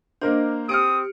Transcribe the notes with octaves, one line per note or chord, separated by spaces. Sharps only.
A#3 D4 A#4 C5 D#5
C4 G4 D#6 F6 C#7 D7